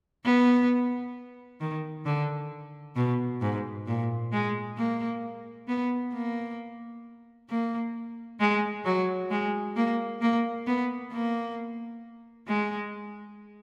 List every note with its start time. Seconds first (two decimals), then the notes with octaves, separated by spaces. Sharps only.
0.25 B3
1.61 D#3
2.06 D3
2.96 B2
3.42 G#2
3.87 A#2
4.32 G#3
4.77 A#3
5.68 B3
6.13 A#3
7.50 A#3
8.40 G#3
8.85 F#3
9.31 G#3
9.76 A#3
10.21 A#3
10.67 B3
11.12 A#3
12.48 G#3